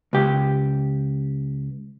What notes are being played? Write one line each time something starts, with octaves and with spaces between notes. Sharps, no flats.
C#2 G4